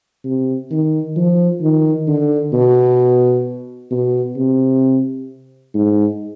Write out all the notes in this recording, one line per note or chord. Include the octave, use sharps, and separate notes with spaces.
C3
D#3
F3
D#3
D3
B2
B2
C3
G#2